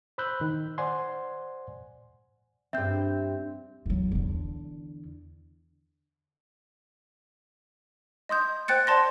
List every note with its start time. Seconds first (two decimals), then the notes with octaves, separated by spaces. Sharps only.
0.18 C5 B5 E6 F#6 G6
0.41 D#3
0.78 C5 D5 F#5 G#5 C6
2.73 G2 C4 E5 G6
3.86 D#1 F#3
4.12 E2 D3
8.29 D#5 C6 D#6 G6
8.68 C5 G5 F#6 A6 C#7
8.87 C5 D5 A5 C6 A#6